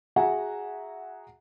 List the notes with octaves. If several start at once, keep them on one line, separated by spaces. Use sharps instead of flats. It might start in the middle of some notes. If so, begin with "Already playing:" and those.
F#4 G#4 E5 F#5 G#5 A#5